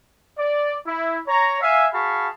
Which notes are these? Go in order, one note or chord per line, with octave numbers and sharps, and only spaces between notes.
D5
E4
C#5 A#5
E5 F5 G#5
F#4 G#4 F5 A5 B5 C#6